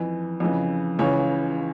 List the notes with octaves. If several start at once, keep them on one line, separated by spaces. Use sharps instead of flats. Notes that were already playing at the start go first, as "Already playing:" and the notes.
Already playing: F2 E3
F2 C#3 E3
C#2 C#3 E3 C#5